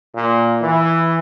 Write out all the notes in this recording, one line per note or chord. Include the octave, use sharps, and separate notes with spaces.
A#2
E3